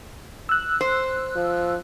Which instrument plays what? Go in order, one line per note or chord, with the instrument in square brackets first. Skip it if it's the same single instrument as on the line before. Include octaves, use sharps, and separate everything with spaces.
[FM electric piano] E6 F#6
[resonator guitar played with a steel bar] C5
[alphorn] F3